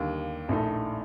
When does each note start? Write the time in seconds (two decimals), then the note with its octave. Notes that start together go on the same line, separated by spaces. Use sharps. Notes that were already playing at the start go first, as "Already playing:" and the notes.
Already playing: D#2 D3 G3 A#3
0.49 A#1 A2 A3 D#4 A4